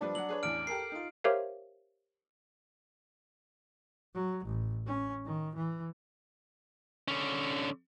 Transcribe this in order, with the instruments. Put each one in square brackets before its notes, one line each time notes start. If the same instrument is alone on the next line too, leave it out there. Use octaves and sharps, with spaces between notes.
[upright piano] F3 G3 B4 [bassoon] D4
[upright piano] F#3 F#5 [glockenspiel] F#7
[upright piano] G#4 B4 C#5
[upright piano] A1 E2 [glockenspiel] F6 D7
[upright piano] G4 A4 A#4 [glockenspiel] C7
[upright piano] D#4 F4
[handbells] G4 A#4 C5 C#5 E5 F5
[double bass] F#3
A1
C#4
D#3
E3
[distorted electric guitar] D3 C#4